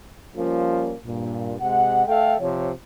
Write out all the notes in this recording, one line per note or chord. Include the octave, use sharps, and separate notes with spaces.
F3 G3 A#3 C#4 F4
G2 A#2
C3 G#3 F#5
A3 A4 E5 F5 G5
C3 F3 C#5